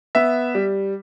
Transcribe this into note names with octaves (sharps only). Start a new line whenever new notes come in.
B3 E5
G3